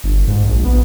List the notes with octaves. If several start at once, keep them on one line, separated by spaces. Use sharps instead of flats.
G1
G#2
A#1
B3